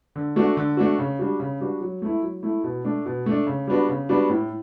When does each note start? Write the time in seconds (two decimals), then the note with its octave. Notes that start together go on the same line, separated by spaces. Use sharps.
0.16 D3
0.36 A3 D4 F#4
0.57 D3
0.77 A3 D4 F#4
0.99 C#3
1.19 G3 D4 F#4
1.40 C#3
1.61 G3 D4 F#4
1.81 F#3
2.02 A3 E4
2.22 F#3
2.43 A3 E4
2.64 B2
2.85 A3 D4
3.06 B2
3.26 A3 D4
3.47 C#3
3.67 G3 B3 D4 F#4
3.89 C#3
4.09 G3 B3 D4 F#4
4.29 A2